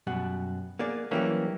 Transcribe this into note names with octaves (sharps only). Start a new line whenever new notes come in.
F#2 B2 G3 F#5
A#3 B3 G#4 D5
E3 F#3 G3 A#3 C#4 G4